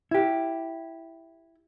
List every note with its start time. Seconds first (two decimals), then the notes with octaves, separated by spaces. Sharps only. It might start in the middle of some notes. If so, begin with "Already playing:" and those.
0.11 E4 G4